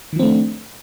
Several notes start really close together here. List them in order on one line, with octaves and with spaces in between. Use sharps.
D#3 F3 C4 A3 D4